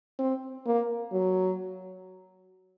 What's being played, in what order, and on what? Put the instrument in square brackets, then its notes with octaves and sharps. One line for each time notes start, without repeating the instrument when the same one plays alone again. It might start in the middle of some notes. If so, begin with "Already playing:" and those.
[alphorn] C4
A#3
F#3